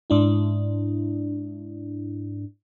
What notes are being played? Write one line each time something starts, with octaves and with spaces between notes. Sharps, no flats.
G#2 D4 E4